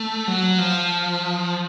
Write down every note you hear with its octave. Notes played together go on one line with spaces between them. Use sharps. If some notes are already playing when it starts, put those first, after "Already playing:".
Already playing: A3
F#3
F3